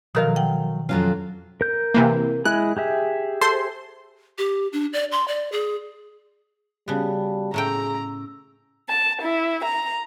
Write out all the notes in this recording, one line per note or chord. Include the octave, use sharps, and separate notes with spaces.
B2 D#3 F3 F#3 A#4 F5
F#5 G5
F2 F#3 C#4 F4
A#4 G6
C3 E3 A#3
G#3 E4 G#4 F#6
G4 G#4 E5
A4 C5 C6
G4
D4
D5
C6
D5
G#4
C#3 G3 B3 F#4 F5 A5
A2 A3 C#4 G#4 G5 A#5 E6
A5
E4
A#5